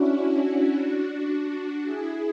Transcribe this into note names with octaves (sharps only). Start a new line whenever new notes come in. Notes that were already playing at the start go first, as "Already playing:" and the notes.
Already playing: C#4 D4 E4 F#4
D4 F#4
C#4 E4
D4 F#4
E4 G#4